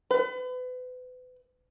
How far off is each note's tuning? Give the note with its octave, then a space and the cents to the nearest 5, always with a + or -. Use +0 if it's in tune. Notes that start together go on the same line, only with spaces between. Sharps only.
B4 +35